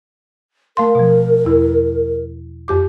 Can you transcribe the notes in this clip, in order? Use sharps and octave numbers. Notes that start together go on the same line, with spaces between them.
A3 A#4 F5 C6
B2 F3
E2 E4
F2 G4 D6